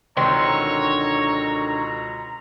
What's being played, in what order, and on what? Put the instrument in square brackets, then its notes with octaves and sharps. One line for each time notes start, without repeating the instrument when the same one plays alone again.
[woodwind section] C#2 B2 A#5 [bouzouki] D3 D#3 [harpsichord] C4 [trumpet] C#5